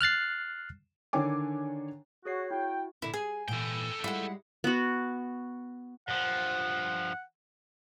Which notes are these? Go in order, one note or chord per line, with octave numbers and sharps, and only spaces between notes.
F6 F#6 A6 C7
D3 D#3 D4 C#5 G#5 D6
F#4 G#4 C#5 C7
E4 F#4 G5
A#2 D3 E4
G#4 G#5
A#2 E3 A4 G5
G3 G#3 E4 F4 F#5
B3 F#4
G2 F3 F#5